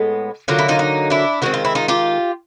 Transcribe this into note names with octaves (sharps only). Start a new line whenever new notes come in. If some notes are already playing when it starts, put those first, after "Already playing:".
Already playing: A2 G#3 B3
D3 F#3 A#3 F4
E4
D#4 F4
D#4
D4 E4
D#3 G#3 C4 F#4
F4
E4
D#4 F4
F4 G4